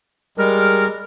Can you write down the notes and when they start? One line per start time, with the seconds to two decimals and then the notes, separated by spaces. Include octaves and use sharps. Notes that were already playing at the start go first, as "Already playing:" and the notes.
0.38 G3 G#3 A#4